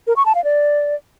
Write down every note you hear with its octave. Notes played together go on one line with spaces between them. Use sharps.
A#4
C#6
A5
F5
D5